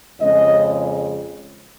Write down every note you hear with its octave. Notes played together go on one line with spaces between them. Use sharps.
F2 C#3 G#3 C#4 D#5